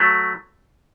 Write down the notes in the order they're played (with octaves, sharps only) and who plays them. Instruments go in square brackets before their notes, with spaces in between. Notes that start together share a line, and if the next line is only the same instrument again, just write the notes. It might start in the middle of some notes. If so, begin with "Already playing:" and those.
Already playing: [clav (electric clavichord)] F#3 A3